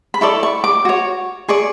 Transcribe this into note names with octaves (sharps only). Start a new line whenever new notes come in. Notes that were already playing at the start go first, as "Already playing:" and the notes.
B5
E4 A4 D5 C#6
C#6
D6
F#4 C#5
G#4 D5 C#6